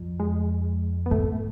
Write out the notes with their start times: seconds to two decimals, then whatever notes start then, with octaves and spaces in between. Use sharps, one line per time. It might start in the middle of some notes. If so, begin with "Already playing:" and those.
Already playing: F2
0.20 G#3
1.06 B3
1.11 G#2 A3